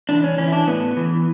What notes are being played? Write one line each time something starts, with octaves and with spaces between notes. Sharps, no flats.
E3 D4
C#4
E3 C#4
E4
D4
A2 B3
E3